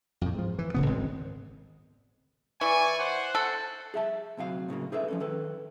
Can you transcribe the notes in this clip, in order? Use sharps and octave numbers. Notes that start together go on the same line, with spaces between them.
F2 A2
G#2 F3
E3
D1 C#3 B3
G#1 D2 G#3 C4
E3 D5 G#5 C#6
C5 F#5
A4
G#4 E5 A5
D2 C3 F#3 F5
A2 C#3 F#3 A#3
D#4 G#4 A4 B4 E5
F3 C#4 A4
D#3 A4 B4